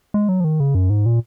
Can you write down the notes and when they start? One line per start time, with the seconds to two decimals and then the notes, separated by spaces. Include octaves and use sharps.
0.14 G#3
0.29 F#3
0.40 F3
0.44 D#3
0.60 C#3
0.75 F#2
0.90 G#2
1.06 A#2